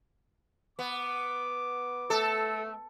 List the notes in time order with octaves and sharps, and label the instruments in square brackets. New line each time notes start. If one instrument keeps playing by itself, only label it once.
[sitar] B3 [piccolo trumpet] D6
[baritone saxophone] A3 [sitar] A4